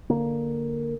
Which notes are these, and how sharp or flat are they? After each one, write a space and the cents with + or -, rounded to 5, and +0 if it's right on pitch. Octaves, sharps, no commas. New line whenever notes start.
D3 +0 A#3 +0